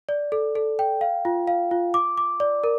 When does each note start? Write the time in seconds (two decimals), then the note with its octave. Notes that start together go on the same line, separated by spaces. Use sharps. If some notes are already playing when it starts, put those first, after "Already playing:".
0.09 D5
0.32 A4
0.55 A4
0.79 G5
1.01 F5
1.25 F4
1.48 F5
1.71 F4
1.94 D6
2.17 D6
2.40 D5
2.64 A#4